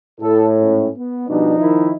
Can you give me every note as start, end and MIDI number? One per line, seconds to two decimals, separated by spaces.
0.20 0.87 45
0.20 0.46 69
0.58 0.89 44
0.58 0.89 61
0.95 1.26 59
1.28 1.54 47
1.28 1.96 53
1.28 1.54 55
1.28 1.54 62
1.28 1.96 63
1.59 1.91 51
1.59 1.91 64